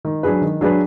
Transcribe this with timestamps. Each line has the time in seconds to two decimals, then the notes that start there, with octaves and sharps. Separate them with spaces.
0.05 D#3
0.23 F#3 D4 G#4 B4
0.42 D#3
0.61 F#3 D4 G#4 B4